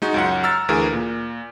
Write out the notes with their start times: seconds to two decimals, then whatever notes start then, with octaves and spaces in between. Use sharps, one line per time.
0.02 G#3 D#4 F#4
0.14 C#2 F#2 F#5
0.43 A#5 E6 F6 A6
0.69 D2 E3 G#4 A#4
0.93 A#2